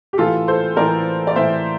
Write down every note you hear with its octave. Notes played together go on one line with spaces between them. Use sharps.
G4
A2 E3 F4 A4
A4 C5
A2 E3 A#4 D5
D5
A2 E3 C5 E5